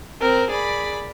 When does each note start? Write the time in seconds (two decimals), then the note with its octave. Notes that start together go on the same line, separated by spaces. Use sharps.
0.21 C4 A#4
0.51 G#4 D5 B5